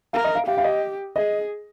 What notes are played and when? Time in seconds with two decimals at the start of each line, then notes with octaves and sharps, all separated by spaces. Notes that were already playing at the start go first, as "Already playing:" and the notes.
0.13 A#4 F5
0.24 D#5
0.35 F5
0.47 G4 F5
0.58 F5
0.64 D#5
1.16 G#4 D#5